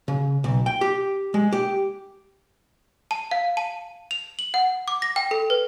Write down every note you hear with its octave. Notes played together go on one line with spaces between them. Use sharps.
C#3
B1
G5
G4
G#3
G4
A5
F5
A5
F7
F#7
F#5
D6
A#6
G5
A4
B4